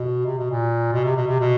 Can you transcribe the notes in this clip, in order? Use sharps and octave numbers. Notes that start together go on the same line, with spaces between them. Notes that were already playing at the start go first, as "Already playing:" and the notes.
Already playing: B2
C3
B2
A#2
B2
C3
B2
C3
B2